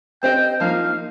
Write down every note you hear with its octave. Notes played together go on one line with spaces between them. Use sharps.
C4 G4 C5 D#5 G5
F3 A#3 D#4 F5